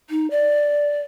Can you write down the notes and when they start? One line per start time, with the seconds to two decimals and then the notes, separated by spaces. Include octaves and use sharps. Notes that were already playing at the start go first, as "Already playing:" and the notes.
0.10 D#4
0.31 D5